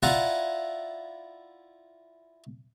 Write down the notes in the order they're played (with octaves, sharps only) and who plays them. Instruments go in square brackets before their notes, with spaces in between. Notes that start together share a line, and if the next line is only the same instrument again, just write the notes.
[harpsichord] E4 F4 D5 F#5 G#5 A#5